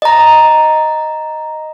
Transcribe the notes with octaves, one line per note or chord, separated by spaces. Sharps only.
D#5 A#5